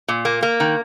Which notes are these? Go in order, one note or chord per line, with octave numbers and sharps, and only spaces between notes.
A#2
A#3
A#3
D#3